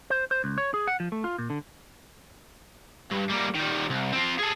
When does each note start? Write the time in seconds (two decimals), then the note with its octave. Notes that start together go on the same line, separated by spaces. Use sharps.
0.10 C5
0.31 C5
0.44 C#2
0.58 C#5
0.74 G#4
0.87 F#5
1.00 F3
1.12 A3
1.24 F4
1.38 A#2
1.50 D3
3.11 G2
3.29 G3 A#3
3.55 D#3 G3
3.90 C2
4.13 C4 F4
4.39 G#4 A4